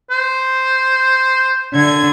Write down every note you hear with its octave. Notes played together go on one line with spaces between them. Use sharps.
C5
D3 G#6